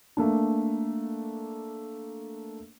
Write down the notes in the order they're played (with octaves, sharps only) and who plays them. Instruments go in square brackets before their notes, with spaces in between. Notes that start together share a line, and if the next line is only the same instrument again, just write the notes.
[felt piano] A3 A#3 D4